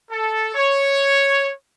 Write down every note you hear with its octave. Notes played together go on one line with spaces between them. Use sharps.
A4
C#5